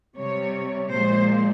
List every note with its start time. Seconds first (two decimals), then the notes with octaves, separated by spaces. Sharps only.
0.17 C3 G3 C#5
0.91 A#2 F3 G#3 C5